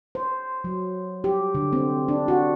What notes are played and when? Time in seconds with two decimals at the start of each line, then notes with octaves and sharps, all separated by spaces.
0.15 C5
0.64 F#3
1.24 G4
1.55 D3
1.73 C4
2.08 D4
2.28 F#4